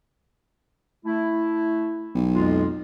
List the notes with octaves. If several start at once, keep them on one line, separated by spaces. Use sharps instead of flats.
A3 E4
B1
F2 G#3 F4